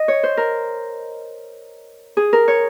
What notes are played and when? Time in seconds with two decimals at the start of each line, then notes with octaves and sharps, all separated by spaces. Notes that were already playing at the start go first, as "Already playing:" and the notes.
Already playing: D#5
0.08 C#5
0.23 C5
0.37 A#4
2.17 G#4
2.33 A#4
2.48 C#5